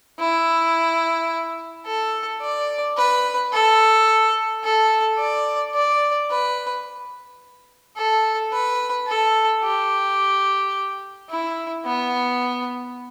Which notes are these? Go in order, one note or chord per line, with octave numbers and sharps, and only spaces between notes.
E4
A4
D5
B4
A4
A4
D5
D5
B4
A4
B4
A4
G4
E4
B3